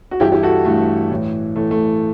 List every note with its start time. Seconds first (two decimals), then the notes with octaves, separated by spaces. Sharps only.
0.11 F#4
0.20 G2 E3 E4 G4
0.32 E4 G4
0.43 F#4 A4
0.65 G2 E3 A3
1.11 A2 E3
1.56 A2 E3 A3
1.71 A3